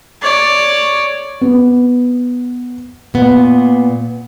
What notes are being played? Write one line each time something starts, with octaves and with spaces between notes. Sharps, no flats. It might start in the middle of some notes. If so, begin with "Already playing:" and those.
C#5 D5
B3
A#2 B3